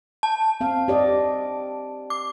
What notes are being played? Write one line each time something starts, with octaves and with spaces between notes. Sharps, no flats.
A5
C4 F5
G4 D5 D#5
D6